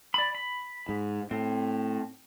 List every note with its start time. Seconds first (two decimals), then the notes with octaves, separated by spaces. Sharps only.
0.14 D5 B5
0.35 B5
0.89 G#2
1.31 A2 C4